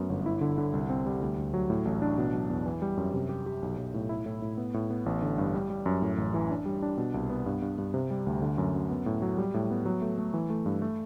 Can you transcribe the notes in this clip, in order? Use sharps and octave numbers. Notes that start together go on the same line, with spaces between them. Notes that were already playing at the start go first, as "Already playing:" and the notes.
Already playing: F#2 A3 B3
G1
E4
D3
D3
C2
C4
G3
D2
D2
F#3
A2
A1
D4
B2
F#3
E2
E3
G3
F#2
C3
G4
G4
B1
B1
A2
E4
A2
A2
B3
A2
B3
A1
D3
G2
G3
G3
F#2
A2
A1
E3
D4
G3
D4
B2
C2
B3
G2
G2
G2
C3
G3
D2
D3
F#2
F#2
B3
A2
F#3
G3
A2
B3
F#3
A3
A3
E3
A3
G2
A3